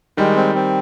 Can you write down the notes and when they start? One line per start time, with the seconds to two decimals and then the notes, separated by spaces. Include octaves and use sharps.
0.17 D#3 G3 G#3
0.36 C4
0.55 C4